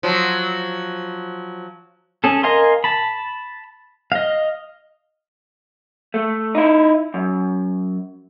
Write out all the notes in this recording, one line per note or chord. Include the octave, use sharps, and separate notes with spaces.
F3 F#3
C#4 G#4 A4
A#4 D#5 F5 G#5 C6
A5 B5
D#5 F5
A3
D#4 E4
F#2